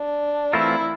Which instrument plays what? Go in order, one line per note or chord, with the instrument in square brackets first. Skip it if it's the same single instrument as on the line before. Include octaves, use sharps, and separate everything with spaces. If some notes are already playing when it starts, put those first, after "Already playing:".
Already playing: [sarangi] D4
[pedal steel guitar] E3 A3 C4 F4 A#4 [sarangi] E4